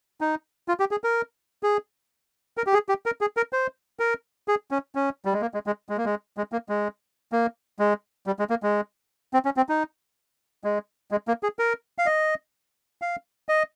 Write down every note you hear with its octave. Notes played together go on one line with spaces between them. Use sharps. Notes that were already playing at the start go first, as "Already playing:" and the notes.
D#4
F4
G4
G#4
A#4
G#4
A#4
G4
G#4
G4
A#4
G#4
A#4
C5
A#4
G#4
C#4
C#4
G3
G#3
A#3
G#3
G#3
G#3
A#3
G#3
G#3
A#3
G#3
A#3
G#3
G3
G#3
A#3
G#3
C4
C#4
C4
D#4
G#3
G#3
A#3
G#4
A#4
F5
D#5
F5
D#5